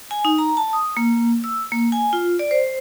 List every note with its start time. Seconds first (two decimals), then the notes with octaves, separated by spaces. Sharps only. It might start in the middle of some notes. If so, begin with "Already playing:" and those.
0.11 G#5
0.25 D#4
0.38 A#5
0.57 A5
0.73 D#6
0.97 A#3
1.44 E6
1.72 A#3
1.92 G#5
2.13 F4
2.39 D5
2.51 C5